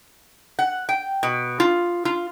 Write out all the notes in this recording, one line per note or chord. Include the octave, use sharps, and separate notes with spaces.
F#5
G5
B2
F4
F4